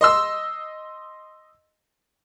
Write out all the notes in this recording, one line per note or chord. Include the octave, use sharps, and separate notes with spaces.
D#5 C6 E6